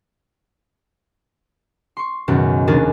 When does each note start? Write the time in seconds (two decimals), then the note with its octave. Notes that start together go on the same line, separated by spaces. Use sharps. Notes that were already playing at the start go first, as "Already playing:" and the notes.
1.97 C6 C#6
2.28 C#2 F#2 B2 D#3
2.68 F1 D#2 D4 G#4 A#4 A6